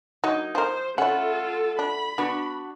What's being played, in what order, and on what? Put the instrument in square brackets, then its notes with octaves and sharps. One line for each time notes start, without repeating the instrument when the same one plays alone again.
[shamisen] F#3 [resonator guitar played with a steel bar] A#3 D#4
[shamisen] F3 A#4 [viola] C5
[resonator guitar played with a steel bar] A3 F#5 [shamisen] C#4 E4 [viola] F4 A4
[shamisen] D4 [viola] B5
[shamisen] B3 [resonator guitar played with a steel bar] D4 F#4